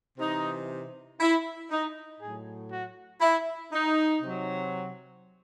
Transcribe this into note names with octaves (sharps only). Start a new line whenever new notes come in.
C3 E3 D#4
E4
D#4
A2 F#3 G#4
F#4
E4
D#4
C3 F#3